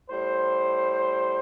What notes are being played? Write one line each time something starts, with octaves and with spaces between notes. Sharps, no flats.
A2 G3 C5